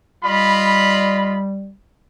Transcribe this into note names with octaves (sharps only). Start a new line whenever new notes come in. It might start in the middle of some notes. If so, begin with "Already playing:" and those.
G3 F4 D#5 B5